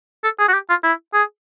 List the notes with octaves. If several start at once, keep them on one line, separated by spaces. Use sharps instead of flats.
A4
G#4
F#4
G4
F4
E4
G#4